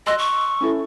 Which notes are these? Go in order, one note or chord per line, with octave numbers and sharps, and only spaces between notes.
D#5 C6 E6 F#6
C#6
C#4 E4 A4